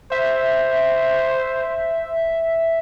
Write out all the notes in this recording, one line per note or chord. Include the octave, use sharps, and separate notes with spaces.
C5 E5